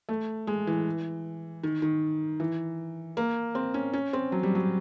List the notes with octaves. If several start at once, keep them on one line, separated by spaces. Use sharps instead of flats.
A3
G#3
E3
D#3
D#3
E3
A#3
C4
C#4
C#4
C4
F#3
G3
F#3